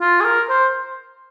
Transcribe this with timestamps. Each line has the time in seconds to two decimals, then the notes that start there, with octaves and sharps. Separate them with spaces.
0.01 F4
0.21 G#4
0.24 A#4
0.50 C5